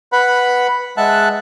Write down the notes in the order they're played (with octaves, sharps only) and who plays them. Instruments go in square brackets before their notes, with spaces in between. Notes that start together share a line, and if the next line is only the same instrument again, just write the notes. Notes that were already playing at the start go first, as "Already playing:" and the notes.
[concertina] B4 F#5 B5
G#3 E5 F#5 A5 F#6